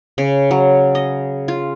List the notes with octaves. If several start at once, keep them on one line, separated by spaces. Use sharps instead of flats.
C#3
F#3
D#5
F4